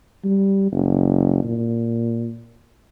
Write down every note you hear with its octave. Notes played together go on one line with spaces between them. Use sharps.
G3
F#1
A#2